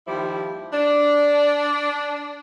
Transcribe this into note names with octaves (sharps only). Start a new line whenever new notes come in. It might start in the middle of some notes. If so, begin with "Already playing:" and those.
D#2 F3 G3 E4
D4